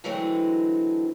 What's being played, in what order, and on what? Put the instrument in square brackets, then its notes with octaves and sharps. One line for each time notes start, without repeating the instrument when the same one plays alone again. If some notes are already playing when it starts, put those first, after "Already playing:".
[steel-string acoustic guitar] D3 E3 F#3 G#3 A3 C4